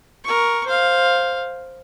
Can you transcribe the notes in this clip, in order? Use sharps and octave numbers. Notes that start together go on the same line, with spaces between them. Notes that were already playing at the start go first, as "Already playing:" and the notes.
A#4 C#6
C5 F5